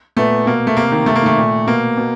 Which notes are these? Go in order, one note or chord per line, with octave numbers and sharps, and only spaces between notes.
A#2 A3 B3
B2 A#3
A3
C3 A#3
D#3
C3 A3
A#3
D#3 A3
A#2
B2 A#3
B2